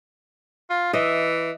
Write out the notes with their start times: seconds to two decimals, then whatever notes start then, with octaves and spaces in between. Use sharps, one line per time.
0.70 F4
0.93 E3 D#5 E5